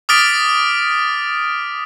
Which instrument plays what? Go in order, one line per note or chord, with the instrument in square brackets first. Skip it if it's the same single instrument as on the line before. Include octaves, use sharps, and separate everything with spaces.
[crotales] D6 D#6 F6 A6 B6 D7